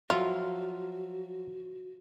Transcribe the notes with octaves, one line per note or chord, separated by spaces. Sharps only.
F3 F#3 F4 F#4 E5